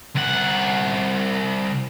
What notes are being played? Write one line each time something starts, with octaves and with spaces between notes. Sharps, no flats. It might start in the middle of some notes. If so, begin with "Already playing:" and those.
C2 F#5